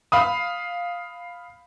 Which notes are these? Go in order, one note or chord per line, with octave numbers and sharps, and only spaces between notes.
F5 B5 D#6